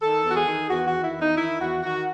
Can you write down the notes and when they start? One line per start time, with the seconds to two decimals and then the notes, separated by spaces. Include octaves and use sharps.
0.01 D#3 A4
0.23 E2
0.29 F#4
0.34 G#4
0.46 D#3
0.68 E2 F#4
0.86 D#3 F#4
1.02 E4
1.13 E2
1.19 D#4
1.36 D#3 E4
1.58 E2 F#4
1.82 D#3 F#4